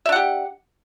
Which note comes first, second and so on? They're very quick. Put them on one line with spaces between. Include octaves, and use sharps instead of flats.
E5 D4 F#5 G4